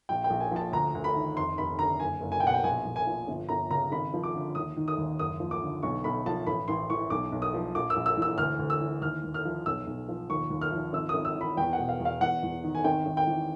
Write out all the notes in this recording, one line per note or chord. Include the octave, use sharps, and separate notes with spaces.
A#1 G5
G5
A#1
G#5
F3 A5
D2 A#5
D2
B5
D#3
F1 C6
F1 B5
D3 A#5
F#1 G#5
F#1
G#5
G5
B2 F#5
G5
A#1 G#5
A#1
G#5
F3
G1
G1 A#5
C#3 A#5
G#1 B5
F3
D6
D3
D#2 D#6
D#3
D#6
D#2
F#1 D#6
F3
D6
D3
B1 C#6
B1 B5
F3 A5
A1 B5
A1 C6
E3 C#6
B1 D6
B1
D#6
F3
A#1 D6
E6
A#1
E6
E3 E6
D2 F6
D2
E6
E3
D#2 F6
D#2
F6
F3
B1 E6
B1
F3
D#2 C#6
D#2
F6
F3
G#1 E6
D#6
G#1
E6
E3 B5
E2 G5
F#5
B2
F5
E2
F5
E2 F#5
E2
D#3
G#5
G#1 G5
G#1
G5
E3